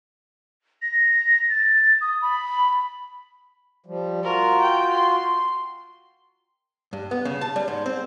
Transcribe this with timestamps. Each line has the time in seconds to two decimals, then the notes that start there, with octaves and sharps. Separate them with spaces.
0.82 A#6
1.50 A6
2.01 D#6
2.22 B5
3.86 F3 G3
4.23 F4 F#4 A#4
4.62 G5
4.92 C6
6.93 G2
7.11 B3
7.25 C#3
7.41 A5
7.56 G3
7.68 G#2
7.86 C4